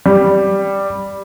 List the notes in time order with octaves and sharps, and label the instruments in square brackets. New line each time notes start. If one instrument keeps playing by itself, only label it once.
[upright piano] G3